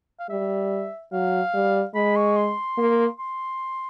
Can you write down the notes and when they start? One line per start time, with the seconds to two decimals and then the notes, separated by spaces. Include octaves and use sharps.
0.20 F5
0.29 G3 E5
1.12 F#3 F5
1.54 G3
1.95 G#3 B5
2.16 C#6
2.36 C6
2.78 A#3
3.19 C6